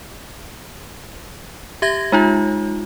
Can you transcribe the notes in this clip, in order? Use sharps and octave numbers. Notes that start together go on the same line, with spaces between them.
G4 E5 G#6 A#6
G#3 D#4 F4